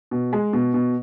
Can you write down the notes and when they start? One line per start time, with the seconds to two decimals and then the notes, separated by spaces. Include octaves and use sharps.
0.11 B2
0.33 G#3
0.53 B2
0.74 B2